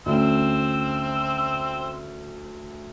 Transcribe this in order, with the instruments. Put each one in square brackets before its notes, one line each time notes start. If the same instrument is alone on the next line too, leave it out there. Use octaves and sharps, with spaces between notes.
[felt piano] D2 C#4 [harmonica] C4 C5 E6